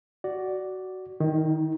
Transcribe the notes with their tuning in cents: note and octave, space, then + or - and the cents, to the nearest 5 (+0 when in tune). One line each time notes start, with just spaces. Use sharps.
F#4 +15 D5 +0
D#3 +0 D#4 +45